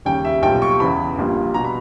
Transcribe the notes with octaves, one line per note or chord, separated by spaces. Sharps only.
D#2 C#3 G3 G5
E5
B1 A#2 G3 G5
C#6
E2 C#3 E3 B5
A#1 A#2 G3
B2 G3 A#5
B5